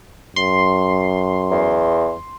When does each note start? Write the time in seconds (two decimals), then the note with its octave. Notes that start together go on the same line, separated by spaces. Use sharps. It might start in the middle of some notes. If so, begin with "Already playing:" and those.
0.36 F#2 C6
1.51 E2